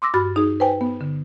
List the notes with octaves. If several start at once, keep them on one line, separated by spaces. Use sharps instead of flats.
C6 D6 E6 A#6
G2 F#4 B5 F6 A6
D#4 G#4
B4 C5 G5 G#5
B3
D3